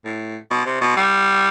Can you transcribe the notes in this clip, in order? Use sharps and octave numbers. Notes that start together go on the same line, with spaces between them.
A2
B2
C3
B2
G3